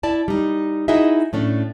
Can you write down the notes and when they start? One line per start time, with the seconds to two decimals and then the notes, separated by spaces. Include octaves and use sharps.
0.03 E4 D5 A5
0.28 G3 D#4
0.88 D#4 E4 F#4 G#4 D#5 E5
1.33 A2 A3 C#4 D4